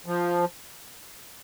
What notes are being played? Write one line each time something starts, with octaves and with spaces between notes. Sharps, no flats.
F3